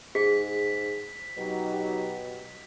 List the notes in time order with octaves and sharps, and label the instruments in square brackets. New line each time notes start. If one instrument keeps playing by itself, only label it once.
[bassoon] G#2 [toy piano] G#4 [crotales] B6
[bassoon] B2 [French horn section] F#3 D#4 G4